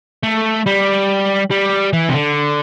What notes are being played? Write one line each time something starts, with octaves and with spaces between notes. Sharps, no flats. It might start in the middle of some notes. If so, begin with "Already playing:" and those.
A3
G3
G3
E3
C3
D3